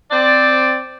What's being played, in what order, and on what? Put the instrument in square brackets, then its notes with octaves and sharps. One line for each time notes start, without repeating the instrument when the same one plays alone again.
[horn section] C4 D5